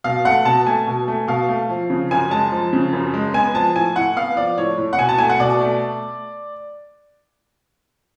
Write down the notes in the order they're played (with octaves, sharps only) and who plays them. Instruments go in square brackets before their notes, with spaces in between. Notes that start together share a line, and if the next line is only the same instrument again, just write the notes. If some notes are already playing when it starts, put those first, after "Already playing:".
[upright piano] B2 F5
A3 F#5
B2 A5
A3 G#5
B2
A3
B2 F5
A3
F3
C#3
F#2 G#5
G#3 A5
F3
C#3
F#2
G#3
B3 G#5
F3 A5
A2 G#5
A2 F#5
B3 F5
F3 D5
A2 C#5
A2
F#5
B2 G#5
A5
A3 G#5
F#5
B2 D5
A3